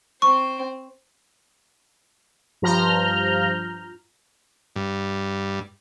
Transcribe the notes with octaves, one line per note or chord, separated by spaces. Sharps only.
C4 C5 C#6
G2 F3 A#5 F6 G6
G2